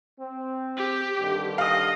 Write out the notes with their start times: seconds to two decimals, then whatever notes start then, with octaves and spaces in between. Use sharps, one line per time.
0.20 C4
0.77 G4
1.20 G2 D3 D#3
1.58 D#5 F5 D#6